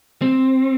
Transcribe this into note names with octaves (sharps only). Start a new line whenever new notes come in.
C4